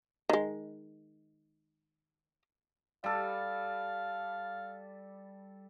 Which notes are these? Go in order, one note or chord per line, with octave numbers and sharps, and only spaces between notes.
D#3 G#3
G3 A4 F5